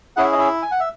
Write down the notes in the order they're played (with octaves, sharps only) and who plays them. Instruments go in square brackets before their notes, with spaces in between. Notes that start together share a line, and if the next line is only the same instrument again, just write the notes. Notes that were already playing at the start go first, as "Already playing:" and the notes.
[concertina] C#4 E4 G#4 F#5
E5
D#5
E4 E5
G#5
F#5
E5